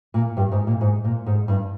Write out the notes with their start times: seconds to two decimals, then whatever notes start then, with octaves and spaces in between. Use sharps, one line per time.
0.14 A#2
0.37 G2
0.52 G#2
0.67 A#2
0.81 G#2
1.04 A#2
1.26 G#2
1.48 G2